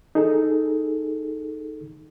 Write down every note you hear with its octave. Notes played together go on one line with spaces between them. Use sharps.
D#4 G#4 A4